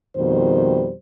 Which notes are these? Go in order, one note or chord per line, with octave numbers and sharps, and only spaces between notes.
F2 B2 D#3 G3 C5